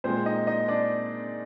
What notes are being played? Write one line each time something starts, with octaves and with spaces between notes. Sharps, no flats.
A#2 G#3 C4 C5
D#4 D#5
D#4 D#5
D4 D5